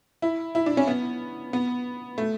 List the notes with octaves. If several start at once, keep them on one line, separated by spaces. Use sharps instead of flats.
E4
E4
D4
C#4
B3
B3
A3